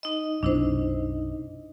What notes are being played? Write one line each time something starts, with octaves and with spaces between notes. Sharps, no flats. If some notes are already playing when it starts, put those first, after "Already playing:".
D#4 D#5
B1 F#2 C3 D4 E4 C5